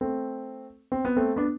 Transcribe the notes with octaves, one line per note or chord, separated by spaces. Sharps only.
A3 C4
C4
B3
A3 C4
B3 D4